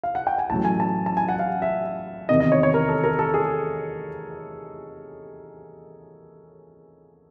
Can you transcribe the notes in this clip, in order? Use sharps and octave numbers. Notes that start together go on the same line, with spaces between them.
F5
F#5
G5
G#5
A1 A2 F#3 A5
G#5
A5
A5
G#5
F#5
F5
E5
E2 C3 D#3 D#5
D#5
C#5
C#5
A#4
A4
A#4
A4
G#4